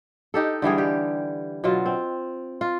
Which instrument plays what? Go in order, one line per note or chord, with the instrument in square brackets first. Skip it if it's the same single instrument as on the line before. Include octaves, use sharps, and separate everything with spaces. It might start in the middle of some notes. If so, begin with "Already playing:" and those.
[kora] D#4 G4 A4
D3 E3 G3 G#4
G4
B2 F#3 F4
C4
F4